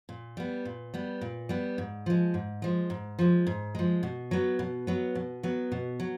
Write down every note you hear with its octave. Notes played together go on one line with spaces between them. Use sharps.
A#2
G3 B3
A#2
G3 B3
A#2
G3 B3
G#2
F3 G#3
G#2
F3 G#3
G#2
F3 G#3
G#2
F3 G#3
B2
F#3 B3
B2
F#3 B3
B2
F#3 B3
B2
F#3